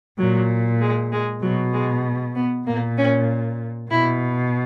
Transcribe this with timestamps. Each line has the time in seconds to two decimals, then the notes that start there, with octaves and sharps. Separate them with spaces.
0.19 A#2 F#3
0.81 G#3
1.12 G#3
1.42 B2 F#3
1.73 G#3
2.35 B3
2.66 A#2 A#3
2.97 C#4
3.90 B2 E4